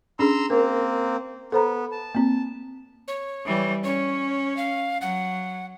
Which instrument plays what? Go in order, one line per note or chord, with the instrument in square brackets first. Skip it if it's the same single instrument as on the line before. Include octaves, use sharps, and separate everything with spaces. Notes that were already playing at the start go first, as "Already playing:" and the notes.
[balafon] C#4 D4 G#4 [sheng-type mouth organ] A#5 C6 E6
[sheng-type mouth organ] A#3 C4 [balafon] A#4
[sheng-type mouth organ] B3 [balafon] A4 C5 A#5
[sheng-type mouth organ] A5
[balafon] A#3 C4
[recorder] C#5
[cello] E3 G3
[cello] C#4 [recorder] C#5
[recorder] F5
[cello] F#3 [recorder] F#5